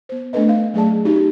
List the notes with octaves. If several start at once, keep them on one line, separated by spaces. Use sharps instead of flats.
B3 C5
A3 C#4 D4 A4 B4 D#5
F5
F#3 A3 G#4 D5 A5
C#4 D#4 F#4 G4